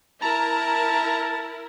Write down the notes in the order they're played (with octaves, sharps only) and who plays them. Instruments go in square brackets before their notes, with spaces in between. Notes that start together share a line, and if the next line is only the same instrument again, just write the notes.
[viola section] E4 A#4 [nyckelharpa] A5 [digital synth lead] A#5